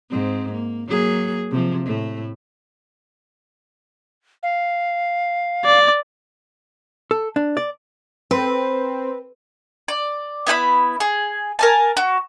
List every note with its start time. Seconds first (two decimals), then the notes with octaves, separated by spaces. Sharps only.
0.11 G#2 C4
0.52 A#3
0.88 F#3 A#3 G#4
1.51 C3 F3
1.86 A2 A3
4.43 F5
5.65 D5
7.11 A4
7.36 D4
7.57 D5
8.31 C4 B4
9.88 D5
10.47 B3 E4 F#5 B5
11.00 G#4
11.59 A#4 G#5 A5
11.97 F#4